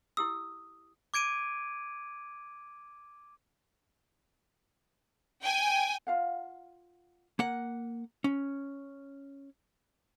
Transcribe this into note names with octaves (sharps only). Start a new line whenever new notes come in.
E4 G4 D#6 E6
D6 G#6 D7 D#7
G5 G#5
F4 F5 F#5
A#3 F#5
C#4